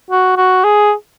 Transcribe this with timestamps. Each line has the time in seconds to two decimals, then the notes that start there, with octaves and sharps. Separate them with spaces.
0.11 F#4
0.37 F#4
0.64 G#4